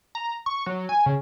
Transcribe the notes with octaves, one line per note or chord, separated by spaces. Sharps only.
A#5
C#6
F#3
G#5
C#3